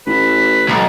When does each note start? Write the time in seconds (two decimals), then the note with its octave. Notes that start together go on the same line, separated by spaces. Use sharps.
0.07 A1 B4
0.68 B1 A4